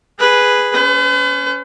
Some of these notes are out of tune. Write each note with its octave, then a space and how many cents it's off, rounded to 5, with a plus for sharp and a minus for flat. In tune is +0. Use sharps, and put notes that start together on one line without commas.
G#4 -5 B4 +0
C#4 +15 B4 +45